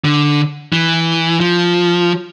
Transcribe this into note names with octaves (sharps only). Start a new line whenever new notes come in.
D3
E3
F3